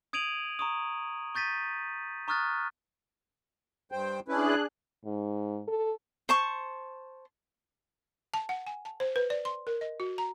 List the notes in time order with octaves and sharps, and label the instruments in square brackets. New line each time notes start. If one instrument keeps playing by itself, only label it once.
[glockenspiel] D#6 G#6 D7 D#7 F7 F#7
A#5 C#6 D#6
C#6 G6 A6 B6 D#7
A#5 C#6 D#6 F6 F#6 A6
[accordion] G2 C5 G5
[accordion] C#4 E4 B4 [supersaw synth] D4 G#4 F#6
[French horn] G#2
A4
[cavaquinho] C5 A5 C#6
[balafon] A5
F#5
G#5
A5
C5
B4
D5
C6
A#4
D#5
F#4
A#5